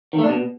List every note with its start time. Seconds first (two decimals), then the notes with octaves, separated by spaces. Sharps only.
0.13 D#3
0.18 A3
0.24 D4
0.29 B2